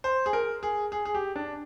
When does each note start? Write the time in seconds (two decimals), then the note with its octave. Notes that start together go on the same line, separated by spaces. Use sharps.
0.04 C5
0.26 G#4
0.33 A#4
0.63 G#4
0.92 G#4
1.05 G#4
1.15 G4
1.36 D4